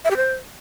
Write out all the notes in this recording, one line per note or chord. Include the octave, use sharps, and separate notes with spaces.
E5
G4
C5